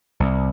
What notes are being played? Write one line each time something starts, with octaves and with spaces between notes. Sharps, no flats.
C2